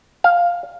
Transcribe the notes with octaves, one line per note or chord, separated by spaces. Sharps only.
F5